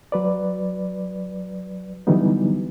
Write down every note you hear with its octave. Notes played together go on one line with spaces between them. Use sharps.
F#3 B4 D5
D3 E3 F#3 G3 B3 D#4